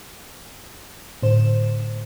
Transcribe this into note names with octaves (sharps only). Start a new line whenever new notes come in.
A2 D3 C5 E7